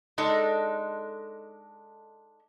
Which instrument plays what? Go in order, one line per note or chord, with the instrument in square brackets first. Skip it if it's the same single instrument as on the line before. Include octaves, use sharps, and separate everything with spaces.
[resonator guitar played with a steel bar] G#3 D4 D#4 A4